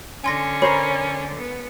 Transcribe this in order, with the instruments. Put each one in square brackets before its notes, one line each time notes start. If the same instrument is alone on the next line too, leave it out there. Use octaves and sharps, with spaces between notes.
[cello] D3 [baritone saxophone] C#4 [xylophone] G#5 C6 A#6
[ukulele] A#4 C5 C#5 [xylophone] A#5 B5
[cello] B3